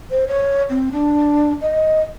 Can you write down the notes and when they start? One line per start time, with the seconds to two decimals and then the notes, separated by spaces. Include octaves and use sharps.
0.11 C5
0.28 C#5
0.70 C4
0.92 D4
1.61 D#5